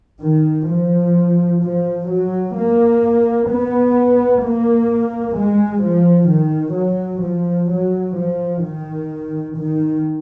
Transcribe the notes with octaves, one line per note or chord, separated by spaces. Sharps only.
D#3
F3
F3
F#3
A#3
B3
A#3
G#3
F3
D#3
F#3
F3
F#3
F3
D#3
D#3